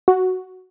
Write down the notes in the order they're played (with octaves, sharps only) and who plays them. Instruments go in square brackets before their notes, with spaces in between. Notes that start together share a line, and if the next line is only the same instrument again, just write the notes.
[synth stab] F#4